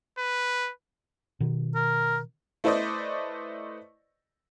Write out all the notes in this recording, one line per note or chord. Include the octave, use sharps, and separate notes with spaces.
B4
B2 D#3
A#4
A3 E4 B4 C5 D5 D#5